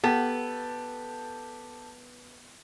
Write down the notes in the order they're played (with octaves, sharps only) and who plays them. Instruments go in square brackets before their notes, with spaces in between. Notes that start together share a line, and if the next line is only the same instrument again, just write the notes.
[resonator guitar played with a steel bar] B3 [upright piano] G4 A4 A5